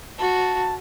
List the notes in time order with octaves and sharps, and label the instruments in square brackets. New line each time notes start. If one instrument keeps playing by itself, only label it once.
[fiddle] F#4 [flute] A5